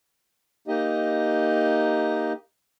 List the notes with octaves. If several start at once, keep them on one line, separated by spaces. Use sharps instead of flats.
A#3 D#4 G4 D#5